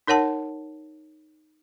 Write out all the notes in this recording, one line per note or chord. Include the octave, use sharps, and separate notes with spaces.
D#4 A#4 C#5 F#5 A5